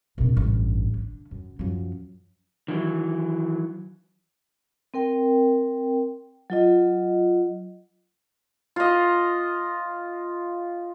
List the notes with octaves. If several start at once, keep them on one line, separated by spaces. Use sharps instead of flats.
A#1 C3
A1 G2
D3
F#2
F#2 F3
D#3 E3 F#3
C4 A#4 G5
F#3 F4 D#5
F4 D#5